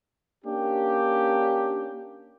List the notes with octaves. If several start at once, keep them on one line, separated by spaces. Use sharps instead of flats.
A#3 C#4 D4 G4